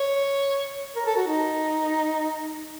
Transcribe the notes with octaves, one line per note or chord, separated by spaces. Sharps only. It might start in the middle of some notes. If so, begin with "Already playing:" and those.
Already playing: C#5
A#4
A4
F#4
D#4